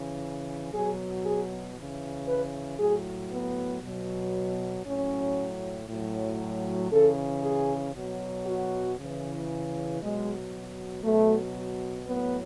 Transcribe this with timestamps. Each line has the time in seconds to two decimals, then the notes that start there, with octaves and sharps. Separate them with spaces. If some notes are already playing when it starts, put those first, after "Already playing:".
Already playing: C#3 E3
0.72 B2 F#3 G#4
1.24 G#4
1.76 C#3 E3
2.27 B4
2.79 A2 F#3 G#4
3.31 B3
3.83 B2 F#3
4.85 A2 F#3 C#4
5.89 A2 F#3
6.92 C#3 E3 A4
7.43 G#4
7.95 B2 F#3
8.46 F#4
8.98 C#3 E3
10.00 B2 F#3 G#3
11.04 B2 F#3 A3
12.07 A2 F#3 B3